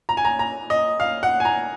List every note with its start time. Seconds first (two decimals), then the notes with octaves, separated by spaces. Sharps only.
0.09 A#5
0.17 G#5
0.25 A#5
0.39 A#5
0.70 D#5
1.00 F5
1.23 F#5
1.40 G#5
1.45 A#5